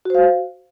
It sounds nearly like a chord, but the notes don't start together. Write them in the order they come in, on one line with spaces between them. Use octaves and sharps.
F#4 C5 F5